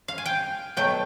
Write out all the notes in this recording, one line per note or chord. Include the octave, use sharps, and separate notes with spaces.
F5
G#5
G5
B2 F#3 A3 G5